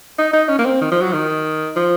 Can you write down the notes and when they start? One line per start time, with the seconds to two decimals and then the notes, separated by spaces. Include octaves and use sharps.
0.18 D#4
0.33 D#4
0.49 C#4
0.59 A#3
0.65 C4
0.81 D#3
0.92 F3
1.02 F#3
1.13 D#3
1.77 F3